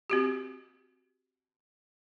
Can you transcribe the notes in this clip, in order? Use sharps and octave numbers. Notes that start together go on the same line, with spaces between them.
C4 F#4 G4